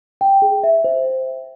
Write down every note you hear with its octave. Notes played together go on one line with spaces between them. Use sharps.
G5
G#4
E5
C5